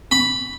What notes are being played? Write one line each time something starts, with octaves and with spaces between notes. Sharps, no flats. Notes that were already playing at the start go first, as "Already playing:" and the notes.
B5